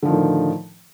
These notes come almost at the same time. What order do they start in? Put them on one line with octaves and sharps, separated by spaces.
D3 F3 D#3 A2